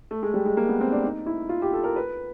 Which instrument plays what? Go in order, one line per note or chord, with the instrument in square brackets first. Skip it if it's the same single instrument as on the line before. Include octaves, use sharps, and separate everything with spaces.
[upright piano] A3
G#3
G3
G#3
A#3
B3
C4
D4
D#4
E4
F4
G4
A4
A#4
B4